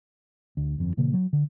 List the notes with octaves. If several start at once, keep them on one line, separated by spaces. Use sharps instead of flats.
D2
G1 F2
A#2 C#3 E3 A#3
F#3
D3